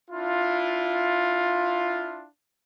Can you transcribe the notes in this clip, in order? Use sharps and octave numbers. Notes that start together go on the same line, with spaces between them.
D4 E4 F4